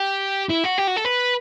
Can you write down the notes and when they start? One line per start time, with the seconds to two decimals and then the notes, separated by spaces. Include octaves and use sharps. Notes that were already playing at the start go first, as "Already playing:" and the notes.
Already playing: G4
0.49 E4
0.64 F#4
0.78 G4
0.87 F#4
0.96 A4
1.05 B4